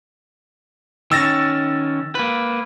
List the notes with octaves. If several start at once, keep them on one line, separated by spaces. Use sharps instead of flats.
D#3 C#4 E6 A6 A#6
A#3 B4